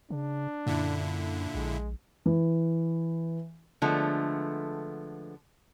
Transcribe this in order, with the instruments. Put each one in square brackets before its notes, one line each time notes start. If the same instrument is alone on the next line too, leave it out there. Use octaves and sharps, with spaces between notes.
[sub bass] C#3 [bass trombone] D4
[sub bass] F#2 [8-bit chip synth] A#2 D3 E4
[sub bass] A#1 [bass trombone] G#3
[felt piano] E3
[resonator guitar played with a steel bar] D3 F3 G#3 A3 B3